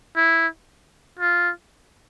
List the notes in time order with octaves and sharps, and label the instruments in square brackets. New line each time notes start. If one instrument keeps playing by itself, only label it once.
[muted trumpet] E4
F4